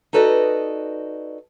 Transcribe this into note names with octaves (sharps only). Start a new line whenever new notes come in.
D#4 F#4 A4 B4 D5 D#5